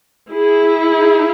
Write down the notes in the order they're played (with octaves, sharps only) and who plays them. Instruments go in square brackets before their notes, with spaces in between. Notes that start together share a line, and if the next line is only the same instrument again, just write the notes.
[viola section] E4 G#4